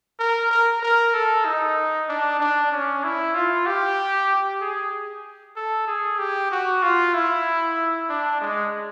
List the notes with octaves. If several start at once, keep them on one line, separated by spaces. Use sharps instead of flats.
A#4
A#4
A#4
A4
D#4
D4
D4
C#4
E4
F4
G4
G#4
A4
G#4
G4
F#4
F4
E4
D4
G#3